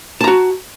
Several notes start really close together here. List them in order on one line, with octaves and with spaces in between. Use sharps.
A5 A#5 F#4